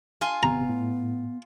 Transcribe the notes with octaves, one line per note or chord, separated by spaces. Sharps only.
F4 G#5 C6
G#1 C3 B3 A#5
A2